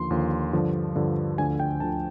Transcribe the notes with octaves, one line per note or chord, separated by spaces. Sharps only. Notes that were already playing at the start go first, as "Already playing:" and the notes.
Already playing: D#2 D3 F3 C6
D#2 D3 F3
G2 D3 F3
G2 D3 F3
D2 D3 F3 G#5
G5
D2 D3 F3 A5